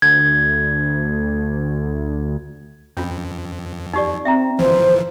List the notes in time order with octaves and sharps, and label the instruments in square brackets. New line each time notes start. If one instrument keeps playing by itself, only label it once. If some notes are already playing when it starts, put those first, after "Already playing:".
[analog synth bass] D2 [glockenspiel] G#6
[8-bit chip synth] F2 [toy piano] C#4 F4
[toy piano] D#4 G4 D5
[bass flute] C4 [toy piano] E5 G5 A#5
[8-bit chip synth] G1 E3 F3 [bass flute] C5